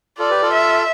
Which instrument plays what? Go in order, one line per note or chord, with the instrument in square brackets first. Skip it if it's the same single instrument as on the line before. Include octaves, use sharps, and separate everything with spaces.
[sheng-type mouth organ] F4 A4 [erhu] D5
[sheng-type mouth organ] G4 B4
F4 A4
[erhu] E5